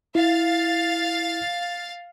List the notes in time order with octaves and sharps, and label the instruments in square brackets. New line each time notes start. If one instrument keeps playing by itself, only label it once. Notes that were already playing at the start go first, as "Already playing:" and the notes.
[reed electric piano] E4 [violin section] F5 A6